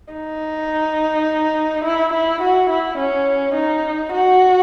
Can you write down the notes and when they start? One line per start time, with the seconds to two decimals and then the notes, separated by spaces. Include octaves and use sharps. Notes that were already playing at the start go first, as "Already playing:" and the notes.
0.13 D#4
1.85 E4
2.13 E4
2.42 F#4
2.70 E4
2.98 C#4
3.55 D#4
4.12 F#4